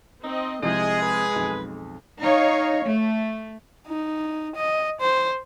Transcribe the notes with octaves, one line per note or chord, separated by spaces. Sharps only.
C4 D#4 D#5
C2 C3 F3 G#3 G#4 D#5
B4
B1 F2
D#4 C#5 F5
A3
D#4
D#5
C5